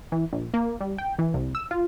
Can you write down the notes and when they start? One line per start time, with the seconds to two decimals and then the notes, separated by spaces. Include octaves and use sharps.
0.12 E3
0.33 A#1
0.54 A#3
0.81 G3
0.98 G5
1.19 E3
1.34 C2
1.55 E6
1.71 F4